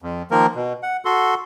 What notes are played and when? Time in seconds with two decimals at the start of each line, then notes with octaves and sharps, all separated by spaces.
0.02 F2
0.31 D#3 F3 A#3 A#4
0.55 B2
0.83 F#5
1.05 F#4 A4 C6